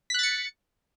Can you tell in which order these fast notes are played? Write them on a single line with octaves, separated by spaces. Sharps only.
B6 F#6 A6 C#7